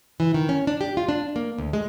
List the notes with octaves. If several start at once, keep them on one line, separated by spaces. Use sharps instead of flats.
E3
D#3
C#4
D4
G4
F4
D4
A#3
D2
G#3